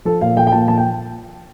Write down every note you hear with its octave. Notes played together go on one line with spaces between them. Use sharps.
F3 A4
A#2 F5
F3 G5
G5
A#2 A5
F3 A5
G5